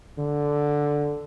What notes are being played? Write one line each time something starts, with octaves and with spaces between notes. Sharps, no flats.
D3